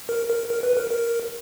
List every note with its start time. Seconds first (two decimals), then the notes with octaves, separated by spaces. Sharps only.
0.09 A#4
0.30 A#4
0.50 A#4
0.63 B4
0.77 A#4
0.90 A#4